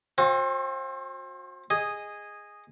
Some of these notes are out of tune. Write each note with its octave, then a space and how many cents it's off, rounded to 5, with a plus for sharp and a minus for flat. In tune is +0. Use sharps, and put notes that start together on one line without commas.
C4 +30 F#4 -35
G#4 -10 D#5 +0